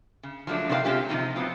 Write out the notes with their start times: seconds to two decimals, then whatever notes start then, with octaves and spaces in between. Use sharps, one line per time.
0.23 C#3
0.47 F3 F#3 G#3 A3 D4
0.69 C3 D#4 F#4 C5 F5 G5
0.85 C3 G#3 C4 C#4 F4 G4
1.09 C3 F3 G3 C#4 D#4 D#5
1.36 F#3 B3 C4 F4